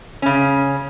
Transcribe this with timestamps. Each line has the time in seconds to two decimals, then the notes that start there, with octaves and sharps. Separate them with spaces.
0.22 C#3 C#4